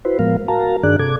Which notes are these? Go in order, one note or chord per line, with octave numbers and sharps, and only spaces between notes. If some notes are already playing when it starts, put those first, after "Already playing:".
E4 F#4 B4 C5
A2 F3 G#3 B3 A#4 F5
F#4 A#4 F5 A5 A#5
G2 D#3 D4 G#4 D5 F#6
C3 A4 D6 G#6